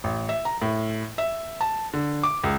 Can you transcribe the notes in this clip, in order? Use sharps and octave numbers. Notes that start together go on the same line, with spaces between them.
A1
E5
A#5
A2
E5
A5
D3
D6
C#2